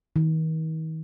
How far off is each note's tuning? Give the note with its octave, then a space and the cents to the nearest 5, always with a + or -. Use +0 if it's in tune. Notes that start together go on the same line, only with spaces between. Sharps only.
D#3 +40